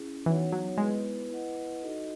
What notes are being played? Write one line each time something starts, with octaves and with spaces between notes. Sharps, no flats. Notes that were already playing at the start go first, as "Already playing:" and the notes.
Already playing: C#4 E4 G#4
E3 B3 D#4 F#4 C#5 F#5
F#3
G#3 B3 E4 B4
E4 B4 D#5 F#5
D#4 F#4 A4 D#5